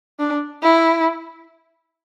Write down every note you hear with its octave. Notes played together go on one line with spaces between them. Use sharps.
D4
E4